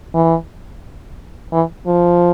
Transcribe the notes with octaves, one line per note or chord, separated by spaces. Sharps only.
E3
E3
F3